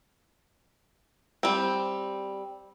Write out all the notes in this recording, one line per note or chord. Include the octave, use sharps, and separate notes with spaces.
G3 C4